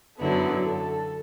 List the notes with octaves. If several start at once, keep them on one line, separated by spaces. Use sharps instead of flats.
F#2 D3 F#3 B3 E4 A4
A4